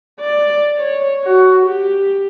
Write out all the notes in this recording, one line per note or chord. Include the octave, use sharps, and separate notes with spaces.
D5
C#5
F#4
G4